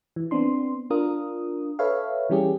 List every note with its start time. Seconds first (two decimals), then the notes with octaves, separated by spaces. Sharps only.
0.16 E3
0.31 B3 C4 D4 C6
0.90 D4 F4 A#4 D#6
1.79 A4 B4 C#5 E5 F5
2.30 E3 G3 C#4 G4 G#4